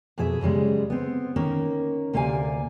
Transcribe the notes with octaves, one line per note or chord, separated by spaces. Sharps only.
F2 B2 G#4 E5
F#2 C#3 G3 G#3
B3 C4
D#3 A#3 C#4
D2 C3 A#3 D5 F5 G#5